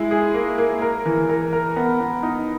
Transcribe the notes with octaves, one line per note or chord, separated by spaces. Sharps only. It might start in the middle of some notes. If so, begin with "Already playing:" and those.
Already playing: G#3 E4
G#4
A#3
A#3
A#4
E3
A#4
A#4
B3
B3
D#4